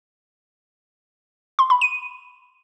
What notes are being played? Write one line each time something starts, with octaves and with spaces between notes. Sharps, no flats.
C6
B5
D#7